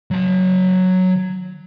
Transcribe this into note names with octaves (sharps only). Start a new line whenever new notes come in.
F#3 A5